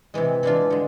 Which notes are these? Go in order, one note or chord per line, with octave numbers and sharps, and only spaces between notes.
C3 E3 G#3
E3 G#3 D4 F4
D3 G#3